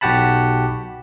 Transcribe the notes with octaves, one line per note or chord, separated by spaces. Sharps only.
B1 F#4 G4 F#5 A5 B5